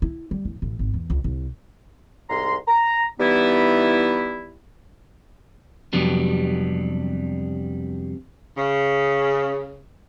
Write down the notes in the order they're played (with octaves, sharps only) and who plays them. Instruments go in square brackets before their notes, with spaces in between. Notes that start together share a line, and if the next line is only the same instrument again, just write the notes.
[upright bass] E4
G3
E2
A1
G#1
E2
C#2
C2
[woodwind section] C2 G#2 A#5 C6
A#5
E3 G3 B3 D#4 E4
[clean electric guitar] F2 C3 F#3 G3 B3 D4
[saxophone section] C#3